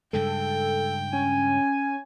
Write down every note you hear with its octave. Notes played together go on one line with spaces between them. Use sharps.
G2 C#3 G#3 A4 G5
C#4 G#5